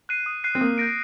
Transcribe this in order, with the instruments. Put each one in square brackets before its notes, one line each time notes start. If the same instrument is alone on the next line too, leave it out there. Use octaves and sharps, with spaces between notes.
[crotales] F#6 C7 D#7
D#6
F#6 C7 D#7
[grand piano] C4
[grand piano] A#3 [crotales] D#6
[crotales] G6 A#6 D7